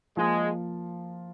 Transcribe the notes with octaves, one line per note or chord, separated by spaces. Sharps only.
F3 G#3 A#3 F4